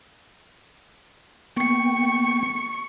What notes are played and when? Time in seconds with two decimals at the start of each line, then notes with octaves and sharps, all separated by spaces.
1.57 A#3 B3 G5 C#6 C#7